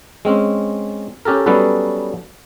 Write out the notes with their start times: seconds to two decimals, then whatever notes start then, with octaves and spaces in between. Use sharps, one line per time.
0.25 G#3 C4 C#4
1.25 C#4 G4 A4 A#4
1.46 F#3 G3 B3 C#4 A4 B4